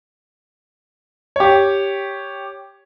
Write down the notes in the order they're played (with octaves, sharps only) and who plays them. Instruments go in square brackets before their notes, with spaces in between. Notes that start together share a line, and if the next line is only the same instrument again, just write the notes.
[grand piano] G4 C#5